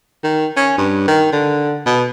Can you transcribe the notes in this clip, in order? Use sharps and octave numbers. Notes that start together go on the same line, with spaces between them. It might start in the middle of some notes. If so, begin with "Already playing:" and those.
D#3
C#4
G2
D#3
D3
B2